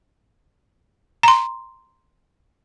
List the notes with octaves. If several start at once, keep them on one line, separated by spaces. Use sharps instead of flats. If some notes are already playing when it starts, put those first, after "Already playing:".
A#5 C6